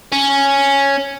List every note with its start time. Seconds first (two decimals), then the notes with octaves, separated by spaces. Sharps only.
0.12 C#4